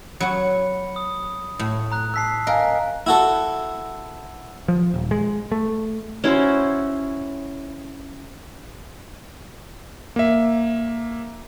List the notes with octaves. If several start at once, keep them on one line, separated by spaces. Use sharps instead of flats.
F#3 F#4 B5 C#7
D#6
A2
A#5 F#6
A5 E6 F#6 B6 C7
A#4 D#5 F5 G#5
E4 F#4 A4
F3
D#1
G#3
A3
C#4 E4 F#4 C5
A#3 E5